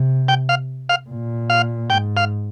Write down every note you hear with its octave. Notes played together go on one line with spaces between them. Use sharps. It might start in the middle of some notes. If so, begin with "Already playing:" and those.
Already playing: C3
G5
F5
F5
A#2
F5
G#2 G5
F5